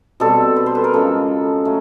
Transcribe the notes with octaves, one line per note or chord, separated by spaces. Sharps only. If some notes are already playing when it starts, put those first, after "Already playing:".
B2 G3 C4 A4
B4
C5
B4
A#4
C#3 F3 G#3 A4
F#3 A3